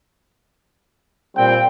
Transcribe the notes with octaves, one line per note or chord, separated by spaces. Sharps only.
A#2 G3 C4 G5